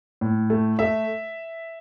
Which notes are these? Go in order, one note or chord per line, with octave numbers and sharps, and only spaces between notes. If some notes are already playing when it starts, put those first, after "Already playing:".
A2
A3
A3 E5